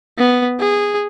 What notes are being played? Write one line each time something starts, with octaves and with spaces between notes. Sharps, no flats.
B3
G#4